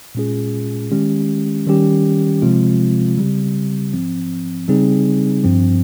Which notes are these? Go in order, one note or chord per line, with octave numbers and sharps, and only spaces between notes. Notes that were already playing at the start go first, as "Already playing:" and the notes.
A#2 G#3 C#4 F4 G#4
D#3 G#3 C#4 G4
D#3 G3 C#4 G4
C3 F3 G#3 C4 F4
C#3 G3 C4 G4
G#2 F3 C4
C#3 G3 C4 D#4 G#4
G2 F3 C4